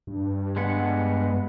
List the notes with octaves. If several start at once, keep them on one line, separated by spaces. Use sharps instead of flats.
G2
G#3 B3 F#5